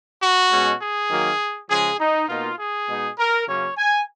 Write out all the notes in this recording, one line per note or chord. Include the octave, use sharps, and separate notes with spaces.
F#4
B2 G#3 C#4
G#4
D#3 F#3 A#3
C#3 F3 G#3 G#4
D#4
B2 A#3 D#4 F4
G#4
B2 G#3 D#4
A#4
C#3 F#3 A#3 C#4 C#5
G#5